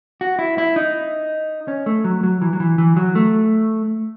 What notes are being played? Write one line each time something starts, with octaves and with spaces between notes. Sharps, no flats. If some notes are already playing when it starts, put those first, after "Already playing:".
F#4
E4
E4
D#4
C#4
A3
F#3
F#3
E3
F#3
E3
E3
F#3
A3